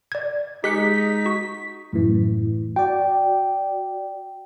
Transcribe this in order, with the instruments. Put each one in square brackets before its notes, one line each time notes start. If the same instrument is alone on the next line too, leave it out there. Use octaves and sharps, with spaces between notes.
[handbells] D5 G#6
[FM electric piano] G#3 [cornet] D#4 [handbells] G4 F#6 C#7 [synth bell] B6
[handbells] F#4 C#6
[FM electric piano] F#2 A2 E3
[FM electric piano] F#4 D5 [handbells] G5